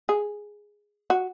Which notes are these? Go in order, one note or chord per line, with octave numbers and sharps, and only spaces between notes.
G#4
F#4